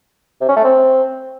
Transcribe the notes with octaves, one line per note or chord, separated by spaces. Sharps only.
C3
C#4
A3
C4